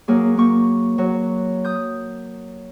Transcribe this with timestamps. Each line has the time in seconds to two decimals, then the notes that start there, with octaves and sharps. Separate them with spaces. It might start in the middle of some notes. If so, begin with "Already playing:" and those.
0.08 F#3 A#3 G#4
0.37 A#3 C#6
0.98 F#3
1.64 D#6 G6